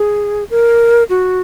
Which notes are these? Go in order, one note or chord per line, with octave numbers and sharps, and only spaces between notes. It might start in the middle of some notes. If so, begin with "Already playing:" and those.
Already playing: G#4
A#4
F#4